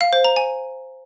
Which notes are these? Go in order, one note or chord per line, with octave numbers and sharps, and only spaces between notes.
F5
C5
A#5
G#5